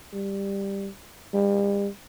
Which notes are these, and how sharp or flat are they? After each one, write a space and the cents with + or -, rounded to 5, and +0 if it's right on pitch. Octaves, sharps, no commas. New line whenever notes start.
G3 +10
G3 +40